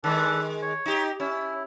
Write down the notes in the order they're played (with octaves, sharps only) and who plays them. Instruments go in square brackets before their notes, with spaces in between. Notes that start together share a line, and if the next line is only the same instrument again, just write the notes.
[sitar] D#3 G#3 [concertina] D4 A4 B4
[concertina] C#5
[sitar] D#4 G4
[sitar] C#4 [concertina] E4